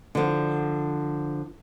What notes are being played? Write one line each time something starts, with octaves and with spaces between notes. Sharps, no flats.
D3 F3